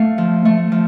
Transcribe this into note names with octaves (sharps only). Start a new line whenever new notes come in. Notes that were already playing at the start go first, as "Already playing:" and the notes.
Already playing: A3 F5
F3
A3
F3